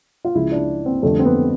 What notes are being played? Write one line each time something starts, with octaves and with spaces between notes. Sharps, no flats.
F4
C#2 C#3 F3 G#3 E4
D4
C4
F2 D3 G3 A3
C4
B3